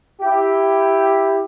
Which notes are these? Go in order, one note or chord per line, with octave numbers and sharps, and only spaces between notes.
E4 G4